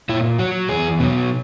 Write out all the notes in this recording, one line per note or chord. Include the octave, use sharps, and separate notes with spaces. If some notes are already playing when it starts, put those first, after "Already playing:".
A#2 E4
F#3 F#4
E2 G#4
B2 F#3